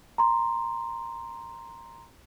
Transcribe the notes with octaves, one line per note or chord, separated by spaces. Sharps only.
A#5 C6